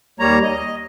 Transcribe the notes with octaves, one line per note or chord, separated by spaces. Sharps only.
D#2 G3 A#3 C#5 A#5
D#5